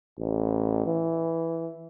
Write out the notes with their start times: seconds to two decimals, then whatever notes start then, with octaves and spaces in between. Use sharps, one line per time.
0.18 A1
0.86 E3